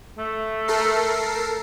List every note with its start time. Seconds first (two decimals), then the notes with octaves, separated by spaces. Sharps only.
0.18 A3
0.68 A4 A#4 C7